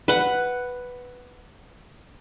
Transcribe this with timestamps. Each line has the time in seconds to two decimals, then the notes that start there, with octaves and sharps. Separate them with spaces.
0.08 B4 F#5